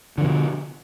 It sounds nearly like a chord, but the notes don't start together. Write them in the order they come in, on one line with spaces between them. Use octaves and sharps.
D3 F3 B2